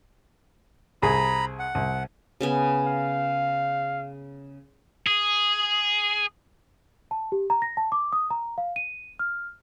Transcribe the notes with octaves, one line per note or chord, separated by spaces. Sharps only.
C2 G#4 A#5 B5
F#5
C2
C#3 B3 G#5
F5
G#4
A5
G4
A#5
A#6
A5
D6
D#6
A#5
F5
D#7
F6